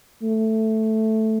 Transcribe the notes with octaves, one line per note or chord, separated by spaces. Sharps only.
A3